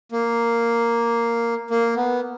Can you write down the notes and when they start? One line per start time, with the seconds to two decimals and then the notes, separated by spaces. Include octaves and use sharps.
0.12 A#3
1.70 A#3
1.96 B3